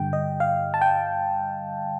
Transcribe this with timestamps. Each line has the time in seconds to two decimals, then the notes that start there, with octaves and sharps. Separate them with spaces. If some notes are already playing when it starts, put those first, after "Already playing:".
Already playing: G2 D3 G3 G5
0.13 D#5
0.40 F5
0.74 A5
0.81 G5